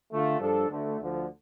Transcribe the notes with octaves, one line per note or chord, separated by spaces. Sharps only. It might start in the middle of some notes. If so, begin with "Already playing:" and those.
D3 A3 F4
G2 F3 D4 A4
D2 D3 A3
D2 D3 F3